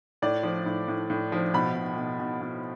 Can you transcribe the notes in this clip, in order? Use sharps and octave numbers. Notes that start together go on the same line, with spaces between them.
A2 D5
F3
A2
A2
A2
F3
B2 B5
B2
B2
B2
B2